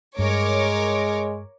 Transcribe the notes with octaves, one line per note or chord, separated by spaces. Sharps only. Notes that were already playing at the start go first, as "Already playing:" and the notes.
G2 G#3 A#4 C#5 D6